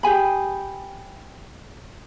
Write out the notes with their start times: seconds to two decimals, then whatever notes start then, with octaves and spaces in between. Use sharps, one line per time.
0.03 G4 G#4 G#5 B5